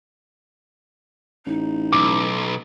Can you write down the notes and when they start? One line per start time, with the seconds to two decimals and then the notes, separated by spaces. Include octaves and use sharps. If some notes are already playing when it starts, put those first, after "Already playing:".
1.46 A1 D#4
1.93 B1 D6